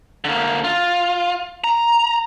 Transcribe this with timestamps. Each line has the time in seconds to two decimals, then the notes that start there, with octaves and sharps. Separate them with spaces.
0.24 D3 A#3
0.64 F4
1.64 A#5